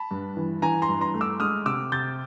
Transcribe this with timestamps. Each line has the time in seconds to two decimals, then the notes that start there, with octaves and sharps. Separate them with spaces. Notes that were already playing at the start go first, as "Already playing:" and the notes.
Already playing: A5 B5
0.11 G2
0.37 E3
0.62 E3 G#5 A#5
0.82 A#5 C6
0.89 G2
1.01 A#5 C6
1.14 A3
1.21 D6 E6
1.40 G#3 D#6 F6
1.66 C3 D6 E6
1.92 C3 G6 A6